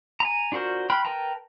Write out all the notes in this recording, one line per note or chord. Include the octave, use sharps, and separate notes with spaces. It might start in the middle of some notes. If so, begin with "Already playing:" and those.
G#5 A#5
D4 F4 F#4 A#4 C5
G5 B5 C6 F6 F#6
A#4 B4 G5 A5 A#5